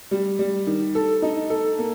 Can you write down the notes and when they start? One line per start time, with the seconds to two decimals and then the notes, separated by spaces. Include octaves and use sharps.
0.11 G3
0.39 G3
0.67 D#3
0.95 A4
1.22 D#4
1.50 A4
1.78 A#3